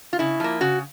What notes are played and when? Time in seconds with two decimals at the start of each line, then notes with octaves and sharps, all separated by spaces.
0.13 F4
0.19 C#3 E4
0.40 F3 A#3
0.61 C#3 F#4